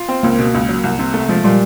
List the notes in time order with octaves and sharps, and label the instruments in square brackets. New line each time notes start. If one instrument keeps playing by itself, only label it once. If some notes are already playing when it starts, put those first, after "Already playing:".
Already playing: [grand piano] F4
C4
[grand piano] C#2 [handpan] A#3
[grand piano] B2
C#2
F#3
C2
C3
A3
[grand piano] F3 [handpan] G#3
[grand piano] A#2 [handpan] G3